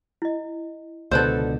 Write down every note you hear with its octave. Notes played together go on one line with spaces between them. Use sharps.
E4 D#5
C#2 B2 D3 A4 B4 C5 D5 C6